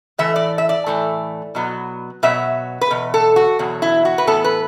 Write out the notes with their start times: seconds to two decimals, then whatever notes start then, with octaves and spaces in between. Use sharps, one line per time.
0.18 A2 E3 A3 E5
0.36 D5
0.58 E5
0.69 D5
0.86 A2 E3 A3
1.55 B2 F#3 B3
2.23 B2 F#3 B3 E5
2.81 B4
2.91 E2 B2
3.14 A4
3.36 F#4
3.59 E2 B2 F#3
3.82 E4
4.05 F#4
4.18 B4
4.27 A2 E3 B3 A4
4.44 B4